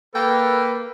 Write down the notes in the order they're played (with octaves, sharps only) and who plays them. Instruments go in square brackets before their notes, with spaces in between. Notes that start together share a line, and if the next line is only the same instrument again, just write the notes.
[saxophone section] A#3 [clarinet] A4 [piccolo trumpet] B4 [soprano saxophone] G5